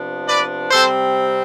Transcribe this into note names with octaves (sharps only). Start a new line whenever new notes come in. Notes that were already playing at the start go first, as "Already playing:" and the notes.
Already playing: C3 F3 B3 D4
B4 D5
C3 G3 C4 A4 C5